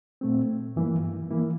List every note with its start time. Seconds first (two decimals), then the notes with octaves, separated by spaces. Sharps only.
0.21 A#2 A3 C4
0.76 G2 E3 A#3 E4
1.31 E3 A#3 E4